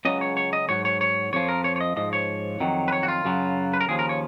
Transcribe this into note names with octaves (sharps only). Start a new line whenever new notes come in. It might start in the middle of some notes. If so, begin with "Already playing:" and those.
C#2 C#3 F#3 D#5
C#5
C#5
D#5
G#2 F#3 C#5
C#5
C#5
F2 F3 C#5
A#4
C#5
C#5
D#5
G#2 F3 D#5
C#5
F2 D#3 F#3
B4
C#5
F#4
F4
F#2 C#3 F#3
B4
A#4
D#2 C#3 F3 G#4
A#4
C#5